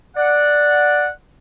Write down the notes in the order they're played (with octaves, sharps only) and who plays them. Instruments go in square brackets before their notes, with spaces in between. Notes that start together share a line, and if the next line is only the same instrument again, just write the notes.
[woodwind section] D5 F#5